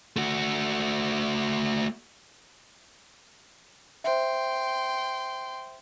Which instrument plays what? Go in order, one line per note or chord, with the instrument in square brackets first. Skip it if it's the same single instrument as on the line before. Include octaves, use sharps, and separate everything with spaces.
[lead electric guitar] A3 F#4
[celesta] C5 E5 [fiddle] G5 C6